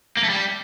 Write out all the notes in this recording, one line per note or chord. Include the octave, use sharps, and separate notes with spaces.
A#3
A3
G3